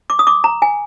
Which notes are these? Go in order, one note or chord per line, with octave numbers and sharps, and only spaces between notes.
D6
D#6
D6
A#5
G#5